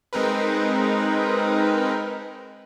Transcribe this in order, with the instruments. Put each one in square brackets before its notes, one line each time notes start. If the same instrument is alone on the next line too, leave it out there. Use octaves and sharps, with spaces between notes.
[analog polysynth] G#3 C4 D#4 A#4 B4